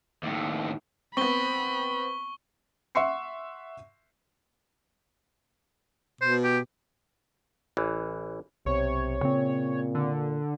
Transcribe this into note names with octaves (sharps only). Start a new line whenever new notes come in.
D#2 A2
B3 C4 B5 C#6 G7
E5 F#5 C6 C#6 C7 C#7
B2 C5
G4
A1 E3
B1 C3 C#5
A#2 C#3 C4
D3